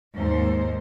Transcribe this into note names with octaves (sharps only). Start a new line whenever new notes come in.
D#2 G#2 C5